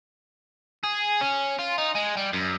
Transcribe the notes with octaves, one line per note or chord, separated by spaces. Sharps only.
G#4
C#4
F4
D#4
G#3
G3
F#2